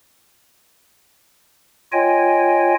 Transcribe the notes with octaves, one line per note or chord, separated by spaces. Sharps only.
F4 C#5 D#5 G5 G#5